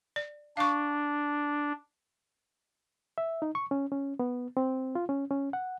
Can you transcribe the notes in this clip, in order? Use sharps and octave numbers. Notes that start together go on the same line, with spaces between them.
D5
D4 F5 C#6
E5
D#4
C#6
C#4
C#4
B3
C4
F4
C#4
C#4
F#5